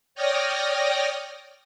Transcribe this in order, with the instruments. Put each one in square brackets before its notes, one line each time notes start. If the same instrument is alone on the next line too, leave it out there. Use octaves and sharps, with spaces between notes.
[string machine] C#5 D5 G5 D#6 F6 A#6